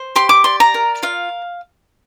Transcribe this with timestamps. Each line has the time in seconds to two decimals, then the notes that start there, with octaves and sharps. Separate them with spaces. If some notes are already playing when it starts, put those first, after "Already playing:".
Already playing: C5
0.16 G4 C6
0.29 D6
0.44 D5 C6
0.60 A#5
0.74 A#4
1.02 F4 F5